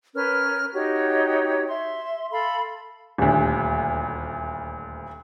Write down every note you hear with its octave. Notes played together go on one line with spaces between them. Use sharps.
C#4 A#4 B4 F6
D#4 F#4 G4 C#5
E5 C6
A4 F5 B5 C6
D#1 D2